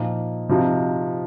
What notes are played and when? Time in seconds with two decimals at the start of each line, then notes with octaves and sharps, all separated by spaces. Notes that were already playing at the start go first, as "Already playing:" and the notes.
Already playing: A#2 F3 D#4
0.49 C3 F3 D#4